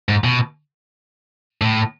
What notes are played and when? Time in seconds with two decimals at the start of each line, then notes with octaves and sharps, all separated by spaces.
0.09 G#2
0.24 B2
1.62 A2